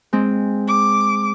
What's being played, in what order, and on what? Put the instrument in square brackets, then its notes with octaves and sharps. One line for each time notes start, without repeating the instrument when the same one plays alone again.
[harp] G#3 C4
[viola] D6